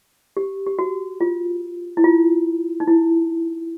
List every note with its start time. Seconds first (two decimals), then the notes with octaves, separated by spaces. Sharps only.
0.37 G4
0.67 G4
0.79 F#4
1.21 F4
1.97 E4
2.04 F4
2.80 D#4
2.88 E4